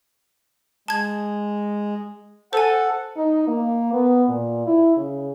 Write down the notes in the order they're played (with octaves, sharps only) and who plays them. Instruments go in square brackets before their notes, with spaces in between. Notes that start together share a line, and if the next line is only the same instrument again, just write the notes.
[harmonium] G#3 [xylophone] A5 G#6
[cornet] A4 [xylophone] C5 G#5 [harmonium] F#5
[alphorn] D#4
A#3
B3
A#2
E4
C#3